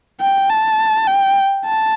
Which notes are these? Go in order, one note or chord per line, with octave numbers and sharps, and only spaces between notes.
G5
A5
G5
A5